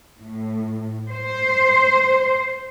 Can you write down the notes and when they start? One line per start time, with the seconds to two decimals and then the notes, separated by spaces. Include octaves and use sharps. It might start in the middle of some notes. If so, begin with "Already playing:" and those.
0.20 A2
1.12 C5